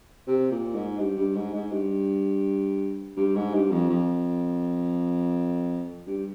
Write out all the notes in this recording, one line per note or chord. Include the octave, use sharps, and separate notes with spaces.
C3
A#2
G#2
G2
G2
G#2
G#2
G2
G2
G#2
G2
F2
F2
G2